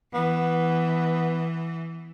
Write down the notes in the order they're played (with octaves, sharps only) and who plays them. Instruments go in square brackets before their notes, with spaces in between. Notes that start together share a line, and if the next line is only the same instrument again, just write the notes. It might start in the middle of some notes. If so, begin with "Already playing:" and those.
[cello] E3 [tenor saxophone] B3